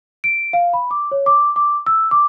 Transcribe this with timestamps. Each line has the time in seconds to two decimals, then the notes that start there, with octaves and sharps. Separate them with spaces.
0.24 D7
0.53 F5
0.73 B5
0.91 D6
1.12 C#5
1.26 D6
1.56 D6
1.86 E6
2.11 D6